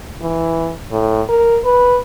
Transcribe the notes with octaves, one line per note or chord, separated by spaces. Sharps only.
E3
A2
A#4
B4